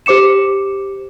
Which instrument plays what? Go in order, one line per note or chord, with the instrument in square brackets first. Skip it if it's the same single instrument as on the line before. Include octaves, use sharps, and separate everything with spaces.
[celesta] G4 C5 D6 C#7 E7